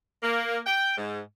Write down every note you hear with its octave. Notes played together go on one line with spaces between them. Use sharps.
A#3
G5
G#2